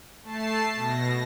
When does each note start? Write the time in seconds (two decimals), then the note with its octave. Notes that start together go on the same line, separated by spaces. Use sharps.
0.23 A3 A5 C7
0.75 B2 A#6